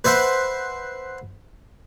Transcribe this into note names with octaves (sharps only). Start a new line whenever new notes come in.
B4 C5 E5 F#5